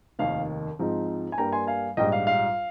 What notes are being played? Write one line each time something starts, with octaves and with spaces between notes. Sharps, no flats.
F1 D#2 D#3 F5
G#2 F3 G#3 C4 D#4
G#5
G2 G3 A#3 G5 A#5
G#5 C6
F5 G#5
A#1 G#2 G3 D#5 G5
F5
F5